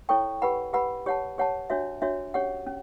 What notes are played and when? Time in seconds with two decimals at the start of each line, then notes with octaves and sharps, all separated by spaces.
0.09 E4 A4 C#5 G5 C#6
0.42 G4 B4 F#5 B5
0.73 G4 B4 F#5 B5
1.06 G4 C#5 F#5 A5
1.38 G4 C#5 F#5 A5
1.70 D4 F#4 C#5 E5
2.02 D4 F#4 C#5 E5
2.34 C#4 G4 C#5 F#5
2.67 C#4